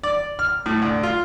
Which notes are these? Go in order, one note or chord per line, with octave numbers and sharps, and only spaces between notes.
D5
F6
A2
D2
F4